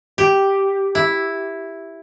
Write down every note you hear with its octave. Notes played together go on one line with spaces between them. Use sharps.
G4
E4